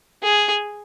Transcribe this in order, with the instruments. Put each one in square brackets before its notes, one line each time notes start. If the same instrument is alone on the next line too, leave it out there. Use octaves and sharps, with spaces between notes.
[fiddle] G#4